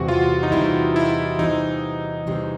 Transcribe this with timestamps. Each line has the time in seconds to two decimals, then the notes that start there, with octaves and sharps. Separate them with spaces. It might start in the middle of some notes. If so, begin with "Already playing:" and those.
Already playing: E2 C3 E3 G3 F#4
0.08 F4
0.43 D#4
0.52 E2 C3 E3 G3 E4
0.96 E4
1.39 E2 C3 E3 G3 D#4
2.27 E2 C3 E3 G3